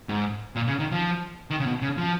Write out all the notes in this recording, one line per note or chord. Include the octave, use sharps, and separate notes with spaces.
G#2
A#2
C#3
D#3
F3
D#3
C#3
B2
C#3
F3